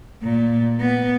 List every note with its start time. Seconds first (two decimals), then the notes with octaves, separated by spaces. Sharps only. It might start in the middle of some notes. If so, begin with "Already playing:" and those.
0.23 A#2
0.80 B3